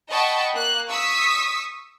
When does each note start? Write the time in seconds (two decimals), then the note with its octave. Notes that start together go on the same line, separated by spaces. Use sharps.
0.11 D#5 F#5 G5 A5 B5 C#6
0.54 A#3 F#6
0.88 C#6 D#6 E6 B6